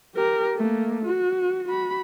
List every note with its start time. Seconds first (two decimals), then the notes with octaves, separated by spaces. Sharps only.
0.16 G4 A#4
0.56 A3 A#3
1.06 F#4
1.68 F#4 B5